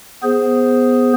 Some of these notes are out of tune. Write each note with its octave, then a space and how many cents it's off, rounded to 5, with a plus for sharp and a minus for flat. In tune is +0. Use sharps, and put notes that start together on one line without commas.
B3 +0 G#4 +0 C5 +0